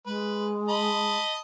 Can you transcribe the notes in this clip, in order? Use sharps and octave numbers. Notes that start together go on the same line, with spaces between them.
G#3 B4
D#5 A5 B5